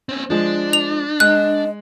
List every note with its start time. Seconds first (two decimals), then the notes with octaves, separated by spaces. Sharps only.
0.09 C4 C#4
0.30 F3 G#3 D4
0.73 F7
1.20 G#3 D#5 F#6